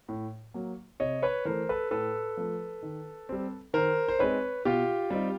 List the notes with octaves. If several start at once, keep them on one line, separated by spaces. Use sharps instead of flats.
A2
F#3 A#3
C3 C#5 D#5
B4 C#5
E3 A3 A#4 C5
A4 B4
A2 A4 B4
F3 A3
D#3
G3 C4
D#3 A#4 C5
C5
G#3 C4 D#4 B4 C#5
B2 F4 G4
G3 C4 D#4